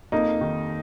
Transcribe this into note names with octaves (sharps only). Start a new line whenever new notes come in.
F2 A#3 D#4
D#3